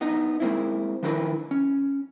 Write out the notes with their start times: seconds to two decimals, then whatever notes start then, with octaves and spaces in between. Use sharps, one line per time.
0.01 B3 D4 D#4 D#5
0.40 G#3 A#3 C4 E4
1.03 D#3 F3 D4 E4 A#4 B4
1.51 C#4